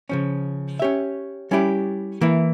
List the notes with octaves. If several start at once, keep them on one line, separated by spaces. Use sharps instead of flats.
C#3 F3 C#4
C#4 G4 C#5 E5
G3 C#4 E4 G4
E3 A#3 E4